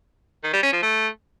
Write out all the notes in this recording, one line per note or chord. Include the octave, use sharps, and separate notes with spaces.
D#3
G3
C#4
F3
A3